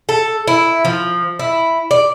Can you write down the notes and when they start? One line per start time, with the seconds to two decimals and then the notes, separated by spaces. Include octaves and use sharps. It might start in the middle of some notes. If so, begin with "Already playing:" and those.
0.09 A4
0.48 E4
0.85 F3
1.39 E4
1.91 D5